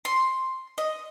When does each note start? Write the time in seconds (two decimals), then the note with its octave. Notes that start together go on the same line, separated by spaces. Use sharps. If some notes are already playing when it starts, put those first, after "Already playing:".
0.05 C6
0.78 D#5